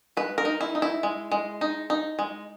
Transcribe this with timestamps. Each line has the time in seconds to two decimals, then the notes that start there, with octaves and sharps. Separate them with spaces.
0.17 G#3 B4
0.38 A#4
0.45 D#4
0.61 E4
0.75 D#4
0.82 E4
1.03 G#3
1.32 G#3
1.61 D#4
1.90 D#4
2.19 G#3